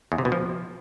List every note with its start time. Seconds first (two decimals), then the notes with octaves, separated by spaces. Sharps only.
0.12 E2
0.18 C3
0.25 B2
0.32 F3